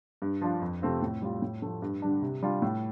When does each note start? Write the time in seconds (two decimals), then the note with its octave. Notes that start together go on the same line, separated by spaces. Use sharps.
0.22 G2
0.41 F3 D4 F4
0.62 F2
0.82 C3 A3 C4 F4
1.02 A2
1.22 G3 F4
1.42 A2
1.62 F3 A3
1.82 G2
2.02 D3 G3 D4
2.22 C3
2.43 G3 D4 F4
2.62 A2